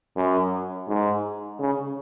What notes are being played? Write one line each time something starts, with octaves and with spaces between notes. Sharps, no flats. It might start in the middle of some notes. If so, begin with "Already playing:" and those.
F#2
G#2
C#3